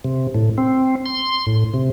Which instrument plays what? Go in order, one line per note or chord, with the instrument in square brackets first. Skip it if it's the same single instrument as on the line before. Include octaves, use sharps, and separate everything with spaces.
[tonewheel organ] C3
A2
C4
C6
A2
C3